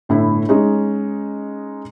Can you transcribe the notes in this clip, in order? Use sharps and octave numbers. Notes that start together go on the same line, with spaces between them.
G1 A2 E4
G#3 C#4 D#4